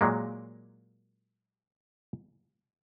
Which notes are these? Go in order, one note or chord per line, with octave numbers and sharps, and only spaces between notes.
A#2 F#3 G#3 A#3